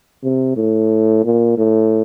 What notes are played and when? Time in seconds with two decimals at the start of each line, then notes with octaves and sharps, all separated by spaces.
0.24 C3
0.56 A2
1.24 A#2
1.58 A2